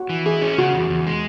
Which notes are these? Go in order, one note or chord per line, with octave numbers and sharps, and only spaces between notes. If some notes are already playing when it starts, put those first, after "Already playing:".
Already playing: F#4
E3
E4 G#4
C#4
C#3 F#4
E2
E2
G#3